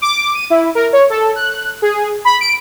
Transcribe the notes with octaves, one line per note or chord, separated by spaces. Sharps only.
D6
D#7
E4
A#4
C#5
A4
F#6
G#4
B5
D7